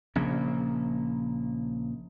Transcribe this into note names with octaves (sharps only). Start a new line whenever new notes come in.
A#1 C#3 A#3